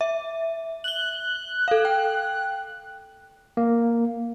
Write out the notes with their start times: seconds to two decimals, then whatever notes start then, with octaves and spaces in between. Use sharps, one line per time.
0.01 E5
0.84 F#6 F#7 G7
1.68 A4 F5
1.85 G5
3.57 A#3